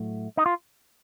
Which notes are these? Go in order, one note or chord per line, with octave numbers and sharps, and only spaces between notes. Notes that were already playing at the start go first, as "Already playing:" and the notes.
Already playing: A2 F#3 A3
D#4
F4